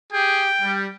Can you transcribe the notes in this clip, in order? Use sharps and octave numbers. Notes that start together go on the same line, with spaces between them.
G4 G#4 G5
G3